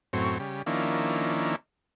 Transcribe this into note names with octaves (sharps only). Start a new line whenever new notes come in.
F#2 A2 C4 C#5
C#3 G3
D#3 F3 A#3 C#4 D4 E4